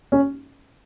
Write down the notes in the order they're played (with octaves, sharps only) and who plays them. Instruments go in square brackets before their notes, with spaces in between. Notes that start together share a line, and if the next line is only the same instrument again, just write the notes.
[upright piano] C#4